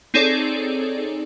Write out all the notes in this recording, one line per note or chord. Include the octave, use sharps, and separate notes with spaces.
C4 D#4 G#4 A4 C#5 D5